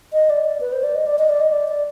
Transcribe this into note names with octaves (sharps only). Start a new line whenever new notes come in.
D#5
D5
D5
B4
C5
D5
D#5
D5
D#5
D5
D#5
D5
D5